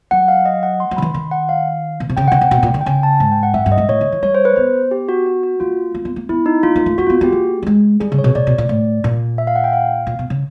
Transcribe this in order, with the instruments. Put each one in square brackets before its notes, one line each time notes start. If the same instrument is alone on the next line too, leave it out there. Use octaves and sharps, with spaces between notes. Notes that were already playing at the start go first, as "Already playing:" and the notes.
[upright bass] F#3 [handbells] F#5
[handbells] F5
D#5
F#5
C6
[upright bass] F#3
[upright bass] D#3 [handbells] B5
[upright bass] E3
[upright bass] D#3 [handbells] C6
[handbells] F#5
F5
[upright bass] B2
C3
[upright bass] C#3 [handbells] G5
[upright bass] C#3 [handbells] F#5
[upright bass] C3 [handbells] G5
[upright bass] B2
A#2
D3
[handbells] G5
[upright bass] C#3 [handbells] G#5
[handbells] A5
[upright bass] G#2 [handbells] G#5
[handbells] G5
F#5
[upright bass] G2 [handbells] E5
[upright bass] G2 [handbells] E5
[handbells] D#5
[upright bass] G#2
[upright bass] A2 [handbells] C#5
[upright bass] D3
E3
[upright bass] G3 [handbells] C#5
[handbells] C5
B4
[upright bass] B3 [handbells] C5
[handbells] G4
F#4
F#4
F#4
[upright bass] A#3 [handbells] F4
[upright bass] A#3
B3
A#3
[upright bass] B3 [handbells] E4
[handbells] D#4
[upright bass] B3 [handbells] F4
[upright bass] A#3
A3
[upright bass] A#3 [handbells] F#4
[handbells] F4
[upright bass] B3
[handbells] F#4
[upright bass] B3 [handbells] G4
[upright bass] A#3 [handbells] G#4
[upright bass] G3
G#3
[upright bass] G3 [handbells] G#4
[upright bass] C#3
[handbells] C#5
[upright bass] B2
[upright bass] A#2 [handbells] D5
[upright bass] B2
A#2
A2
A#2
[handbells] E5
F5
F#5
G5
F5
[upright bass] A#2
B2
C#3